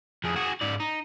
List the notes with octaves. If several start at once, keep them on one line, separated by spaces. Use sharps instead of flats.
F2 G#4
F#4 G#4
G#2 D5
D#4